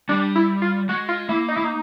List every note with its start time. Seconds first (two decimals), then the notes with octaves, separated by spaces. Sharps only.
0.09 G3 D4
0.35 E4
0.62 F4
0.89 G#3 F#4
1.09 F4
1.29 A#3 E4
1.48 D#4
1.56 A#3 E4
1.64 D#4